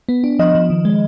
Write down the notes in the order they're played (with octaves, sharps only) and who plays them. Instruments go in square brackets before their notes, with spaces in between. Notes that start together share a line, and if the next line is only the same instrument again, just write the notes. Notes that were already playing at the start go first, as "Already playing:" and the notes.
[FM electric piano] B3
D4
F3 D#5
F3
D#3
G#3